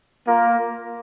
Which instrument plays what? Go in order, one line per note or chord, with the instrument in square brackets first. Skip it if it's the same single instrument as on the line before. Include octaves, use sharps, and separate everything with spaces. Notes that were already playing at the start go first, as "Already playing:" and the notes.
[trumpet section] A#3 F4 A#4